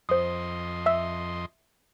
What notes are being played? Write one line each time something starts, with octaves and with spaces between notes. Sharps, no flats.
F2 C5 D#5 C6 D#6
E5 E6